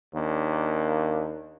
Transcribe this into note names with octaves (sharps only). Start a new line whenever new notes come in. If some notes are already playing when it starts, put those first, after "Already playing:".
D#2 A#3 D4